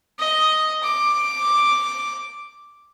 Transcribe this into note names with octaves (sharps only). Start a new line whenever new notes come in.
D#5
D6